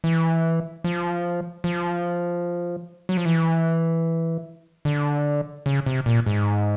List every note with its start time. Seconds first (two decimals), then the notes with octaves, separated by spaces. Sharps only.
0.04 E3
0.84 F3
1.64 F3
3.09 F#3
3.17 F3
3.25 E3
4.85 D3
5.66 C#3
5.86 C3
6.06 A#2
6.26 G#2